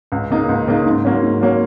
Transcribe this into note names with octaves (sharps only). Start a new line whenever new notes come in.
C#2
C#3 A#3 D#4
C#2
C#3 A#3 D#4
G#2
F#3 A#3 C#4
G#2
F#3 A#3 C#4